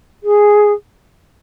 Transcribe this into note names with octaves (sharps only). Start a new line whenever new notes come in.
G#4